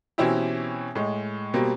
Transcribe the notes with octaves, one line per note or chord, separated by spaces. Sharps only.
B2 E3 C4 C#4 E4 G4
A2 G#3
B2 G3 A#3 C4